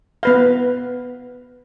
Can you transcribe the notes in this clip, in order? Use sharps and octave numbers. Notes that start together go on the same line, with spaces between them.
B3 B4 F5